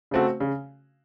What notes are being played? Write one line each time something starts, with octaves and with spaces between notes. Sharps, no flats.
C#3 A3 C4 F#4
C#3